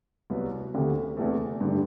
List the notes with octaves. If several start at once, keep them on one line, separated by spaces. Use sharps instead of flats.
C2 C3 F#3 B3
D2 D3 A3 C4 G4
E2 C3 E3 A3
G2 D3 G3